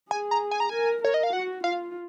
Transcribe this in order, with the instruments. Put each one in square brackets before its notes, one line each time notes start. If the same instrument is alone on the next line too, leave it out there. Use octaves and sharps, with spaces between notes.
[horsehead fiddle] G#4 [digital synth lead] G#5
[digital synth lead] A#5
G#5
A#5
[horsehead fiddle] A#4 [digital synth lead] G#5
[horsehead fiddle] A#4 [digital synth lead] C#5
[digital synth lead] D#5
F5
[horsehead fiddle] F#4 [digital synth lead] F#5
[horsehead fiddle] F4 [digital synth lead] F5